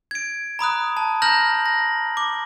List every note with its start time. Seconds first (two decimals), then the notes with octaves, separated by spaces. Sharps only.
0.11 G#6 D7
0.59 A#5 B5 D#6 F#6
0.97 A5
1.22 A#5 F6 G6 A#6 F#7
1.66 A#6
2.17 D6